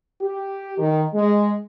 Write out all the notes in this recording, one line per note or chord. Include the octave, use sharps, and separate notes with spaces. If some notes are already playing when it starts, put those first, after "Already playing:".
G4
D#3
G#3